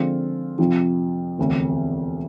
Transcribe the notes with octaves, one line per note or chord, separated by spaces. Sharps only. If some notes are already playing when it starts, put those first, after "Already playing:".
Already playing: D3 F3 G#3 C4 F4
F2 C3 F3
E1 D2 C3